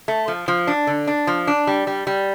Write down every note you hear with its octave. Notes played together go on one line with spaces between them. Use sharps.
A3
F3
F3
D4
D3
D4
F3
D4
G3
G3
G3